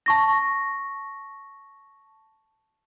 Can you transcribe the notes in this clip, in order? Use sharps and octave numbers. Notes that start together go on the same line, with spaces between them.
A5 C#6 A#6